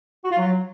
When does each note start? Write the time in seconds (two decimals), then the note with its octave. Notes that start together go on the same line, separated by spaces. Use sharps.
0.24 F#4
0.31 F4
0.38 F#3